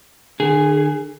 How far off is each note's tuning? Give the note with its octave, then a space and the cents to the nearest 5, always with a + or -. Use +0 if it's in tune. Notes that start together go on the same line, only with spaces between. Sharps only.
D3 +40 G#4 -5